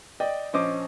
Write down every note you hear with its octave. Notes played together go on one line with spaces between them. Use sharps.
D5 D#5 G5
A#1 C#4 C5 D#5 D6